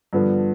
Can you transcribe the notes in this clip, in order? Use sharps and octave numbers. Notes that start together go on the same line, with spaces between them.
G2 D3 F3 B3